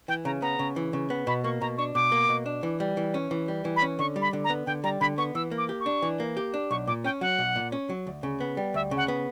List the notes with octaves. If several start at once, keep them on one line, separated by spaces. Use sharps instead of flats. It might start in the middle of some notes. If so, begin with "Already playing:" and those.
E3 G5
C#3 A#5
B3 A#5
C#3
E3
C#3
B3
B2 B5
A#3 C#6
B2 A#5
D4 C#6
B2 D6
A#3
B2
D4
E3
G3
E3
C#4
E3
G3
E3
B5
C#4
D3 C#6
G3
B5
D3
A#5
B3
D3 G5
G3 A#5
D3 B5
B3 C#6
E3 E6
A#3
D6
G4
C#6
D4
E3
A#3
G4
D4
B1 C#6
A#2 D6
C#4 G5
F#3 F#5
B1
A#2
C#4
F#3
D2
C#3
B3
G3
D2 E5
C#3
F#5
B3